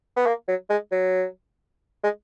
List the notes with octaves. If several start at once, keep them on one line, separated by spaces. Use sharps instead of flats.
B3
A#3
F#3
G#3
F#3
G#3